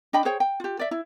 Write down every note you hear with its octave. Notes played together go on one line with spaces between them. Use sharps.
D4 D#5 G5 B5
G#4 C5 C#5 G5
G5
F4 G4
D5 E5
E4